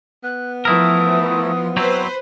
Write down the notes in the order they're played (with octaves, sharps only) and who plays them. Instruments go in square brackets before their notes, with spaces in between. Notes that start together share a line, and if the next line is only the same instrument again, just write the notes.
[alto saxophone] B3 [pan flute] F#6
[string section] E3 F3 [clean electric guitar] A3 E4 A#4 [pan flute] D#6
[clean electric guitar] F#3 C4 E4 [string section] B4 C5